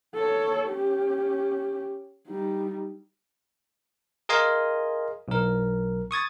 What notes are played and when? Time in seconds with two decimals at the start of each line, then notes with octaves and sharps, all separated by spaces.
0.15 A4 C#5
0.70 C#4 G4
2.27 G3 D#4
4.29 G#4 A#4 D#5 F5 G#5 C6
5.28 B1 A#4
6.11 C#6 D#6 G#6 A6